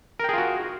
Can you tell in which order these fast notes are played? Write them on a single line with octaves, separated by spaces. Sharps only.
A#4 G5 G#4 F4 F#4